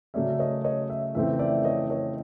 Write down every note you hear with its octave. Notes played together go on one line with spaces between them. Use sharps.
C#3 F#3 A3 C#4 D5 E5
C#5 D#5
C#5 D#5
E5
F2 C#3 E3 A3 C4 E5
D5 E5
C#5 D#5
C#5 D#5